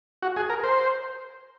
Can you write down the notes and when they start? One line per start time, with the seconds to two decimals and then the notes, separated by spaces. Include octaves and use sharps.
0.22 F#4
0.36 G#4
0.50 A#4
0.64 C5